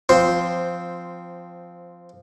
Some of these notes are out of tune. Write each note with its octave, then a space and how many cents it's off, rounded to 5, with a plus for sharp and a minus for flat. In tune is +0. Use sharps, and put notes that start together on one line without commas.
F3 +0 C4 -10 C5 +0